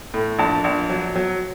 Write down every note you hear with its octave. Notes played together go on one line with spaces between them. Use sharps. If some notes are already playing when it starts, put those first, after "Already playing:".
A2
A#1 A5
A#1
F#3
F#3